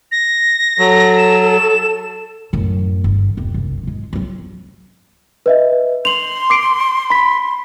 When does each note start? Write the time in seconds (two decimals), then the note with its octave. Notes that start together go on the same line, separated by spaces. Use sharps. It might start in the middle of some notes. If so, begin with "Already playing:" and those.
0.12 A#6
0.79 F#3 A4
1.18 E7
2.53 F#2 A2
3.04 G1
3.37 E1 C4
3.54 F#1 C2
3.83 G#2 G#3
4.13 F#3 C4
5.46 B4 D#5 E5
6.05 C6 F7 F#7
6.50 D6 C7 D7
7.10 B5 B6